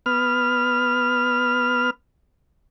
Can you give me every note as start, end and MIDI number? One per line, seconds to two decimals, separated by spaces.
0.06 1.90 59
0.06 1.90 89